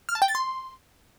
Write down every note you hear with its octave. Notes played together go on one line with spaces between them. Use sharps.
F6
A5
G5
A6
C6